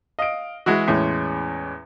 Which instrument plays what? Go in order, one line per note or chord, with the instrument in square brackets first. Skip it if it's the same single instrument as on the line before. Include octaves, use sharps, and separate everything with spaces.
[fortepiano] D#5 [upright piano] F5 D7
[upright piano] E3 [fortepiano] G#3 E4 F#4
[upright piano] E2 G#3 C#4 [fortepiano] A2